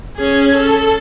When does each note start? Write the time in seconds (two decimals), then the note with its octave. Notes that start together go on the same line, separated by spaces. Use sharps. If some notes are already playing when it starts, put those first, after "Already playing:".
0.17 C#4 G#4
0.55 A4